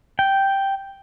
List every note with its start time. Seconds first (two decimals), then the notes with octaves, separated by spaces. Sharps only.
0.19 G5